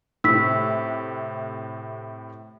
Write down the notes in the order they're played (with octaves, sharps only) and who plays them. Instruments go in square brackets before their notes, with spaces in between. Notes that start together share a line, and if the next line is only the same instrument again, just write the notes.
[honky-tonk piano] A2 C3 [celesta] E6 B6